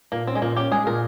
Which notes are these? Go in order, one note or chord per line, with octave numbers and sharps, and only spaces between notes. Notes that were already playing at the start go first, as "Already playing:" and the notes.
A#2 A#3
C4 C#4
G#3
A#2 A#3
C#4 G4
G#3 G#4
A#2 A#4